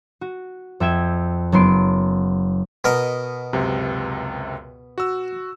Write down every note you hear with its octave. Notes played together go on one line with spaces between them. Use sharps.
F#4
F2 E5 G5 G#6 E7
F#1 F#3 B3 C6 D7
B2 A#4 D#5
C#2 F#2 C3
F#4 E6